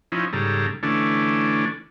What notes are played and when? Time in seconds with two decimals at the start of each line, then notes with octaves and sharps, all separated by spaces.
0.12 F3 C#4 D#4 E4
0.33 G#2 C#3 G3 A4 A#5
0.83 D3 E3 A3 C#4 D4